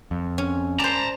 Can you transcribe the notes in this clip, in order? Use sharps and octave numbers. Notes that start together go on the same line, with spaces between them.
F2
C#4
C5 D5 A5 A#5